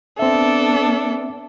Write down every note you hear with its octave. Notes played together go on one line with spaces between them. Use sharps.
B3 C4 D4 A4 E5